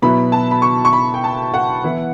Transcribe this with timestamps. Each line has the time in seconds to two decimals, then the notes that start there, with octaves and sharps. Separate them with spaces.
0.02 B2 F#3 B3 E4 B5
0.32 A5
0.51 B5
0.62 C#6
0.85 C#6
0.93 B5
1.14 G5
1.24 A5
1.54 F#5
1.84 E3 B3 E4